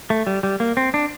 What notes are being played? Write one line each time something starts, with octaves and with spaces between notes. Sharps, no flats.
A3
G3
G3
A#3
C4
D4